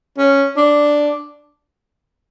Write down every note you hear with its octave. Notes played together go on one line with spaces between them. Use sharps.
C#4
D4